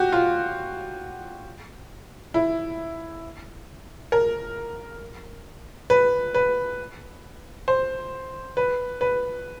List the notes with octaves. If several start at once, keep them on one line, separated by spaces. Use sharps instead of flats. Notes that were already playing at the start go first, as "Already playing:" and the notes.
Already playing: F#4 G4
F4
E4
A#4
B4
B4
C5
B4
B4